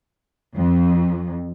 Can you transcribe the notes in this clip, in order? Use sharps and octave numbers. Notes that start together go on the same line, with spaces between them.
F2